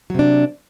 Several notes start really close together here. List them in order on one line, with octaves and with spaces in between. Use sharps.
F#3 C3 D4